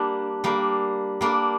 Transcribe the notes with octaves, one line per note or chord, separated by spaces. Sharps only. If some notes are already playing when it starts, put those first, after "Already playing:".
Already playing: G3 A#3 D4
G3 A#3 D4
G3 A#3 D4